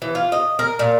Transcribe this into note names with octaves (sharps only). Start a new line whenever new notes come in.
E3
F4
D#5
A#4
A#2